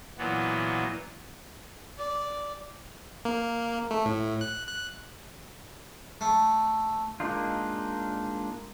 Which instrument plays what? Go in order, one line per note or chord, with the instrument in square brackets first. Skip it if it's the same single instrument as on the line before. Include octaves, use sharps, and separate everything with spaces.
[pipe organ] A#2 E3 F#3 B3
[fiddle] D5
[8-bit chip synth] A#3
A3
A2
F#6
F#6
[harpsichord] A3
[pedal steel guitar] G#3 A#3 D4 D#4 F4